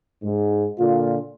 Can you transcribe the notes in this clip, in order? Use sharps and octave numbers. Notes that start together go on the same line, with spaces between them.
G#2
A#2 D3 F4